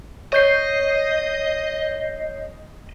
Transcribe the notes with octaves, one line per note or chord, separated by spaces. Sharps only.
C#5 D#5 G6 C7